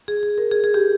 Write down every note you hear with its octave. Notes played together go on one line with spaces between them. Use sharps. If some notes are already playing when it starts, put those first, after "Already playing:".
G#4
G#4
A#4
G#4
G#4
G4